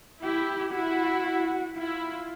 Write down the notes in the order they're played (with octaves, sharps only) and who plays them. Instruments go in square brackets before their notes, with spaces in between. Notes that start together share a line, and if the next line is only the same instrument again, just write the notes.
[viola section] E4 [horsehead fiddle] G4
[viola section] E4 [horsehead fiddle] F#4
[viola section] E4 [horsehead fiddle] F4